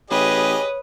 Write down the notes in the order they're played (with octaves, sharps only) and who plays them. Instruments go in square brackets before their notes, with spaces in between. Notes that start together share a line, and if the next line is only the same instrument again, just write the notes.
[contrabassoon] A1 [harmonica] G4 G#4 D#5 [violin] B4 D#6 [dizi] C#5